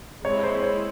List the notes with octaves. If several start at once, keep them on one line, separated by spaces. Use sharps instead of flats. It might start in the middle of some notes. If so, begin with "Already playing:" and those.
G#3 C4 E4 C#5
C5
C#5